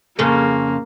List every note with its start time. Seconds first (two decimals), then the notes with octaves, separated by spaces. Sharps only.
0.19 F2 C#3 A#3 A4